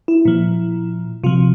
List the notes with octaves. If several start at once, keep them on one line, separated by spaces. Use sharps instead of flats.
E4
A#2 F3
C3 F3 F4